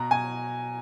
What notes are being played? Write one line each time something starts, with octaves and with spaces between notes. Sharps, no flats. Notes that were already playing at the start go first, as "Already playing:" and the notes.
Already playing: B2 A#5
B2 G#5